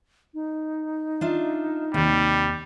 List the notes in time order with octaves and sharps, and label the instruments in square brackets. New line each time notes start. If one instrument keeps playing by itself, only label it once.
[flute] D#4
[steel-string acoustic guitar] D4 F4 E5
[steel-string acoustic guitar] D#2 C3 [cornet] G3